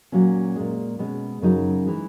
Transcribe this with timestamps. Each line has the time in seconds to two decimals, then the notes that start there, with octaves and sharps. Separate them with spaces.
0.12 A#2 F#3 C#4
0.56 A#2 G#3
0.99 B2 G#3 C#4
1.42 F#2 C#3 F#3 D#4
1.86 E3 G#3